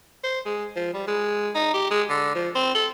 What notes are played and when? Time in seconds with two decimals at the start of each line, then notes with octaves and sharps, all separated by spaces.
0.24 C5
0.46 G#3
0.76 F3
0.94 G3
1.07 G#3
1.55 D#4
1.74 G4
1.91 G#3
2.09 D3
2.35 F3
2.56 C4
2.75 A4